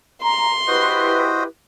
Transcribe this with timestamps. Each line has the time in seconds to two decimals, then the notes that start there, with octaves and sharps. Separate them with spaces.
0.23 A#5 C6
0.67 E4 F#4 G4 B4 C5 D#5